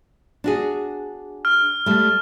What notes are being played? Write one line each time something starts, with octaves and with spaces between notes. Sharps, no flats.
D4 F#4 G#4
F6
G3 A3